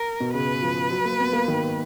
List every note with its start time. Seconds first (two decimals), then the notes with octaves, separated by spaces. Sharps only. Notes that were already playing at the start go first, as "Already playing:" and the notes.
Already playing: A#4
0.20 B2
0.34 C#3 B4
0.62 F3
0.91 F#3
1.05 A#3
1.20 B3
1.33 A#3
1.48 D#3